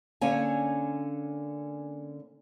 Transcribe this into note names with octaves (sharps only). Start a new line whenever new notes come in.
D3 A#3 C#4 C#5 G#5